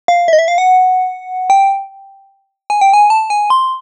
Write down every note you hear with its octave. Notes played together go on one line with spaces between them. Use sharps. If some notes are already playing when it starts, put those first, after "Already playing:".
F5
E5
D#5
E5
F5
F#5
G5
G#5
G5
G#5
A5
G#5
C6